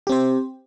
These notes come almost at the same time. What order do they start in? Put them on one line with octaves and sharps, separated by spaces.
G4 C4 C5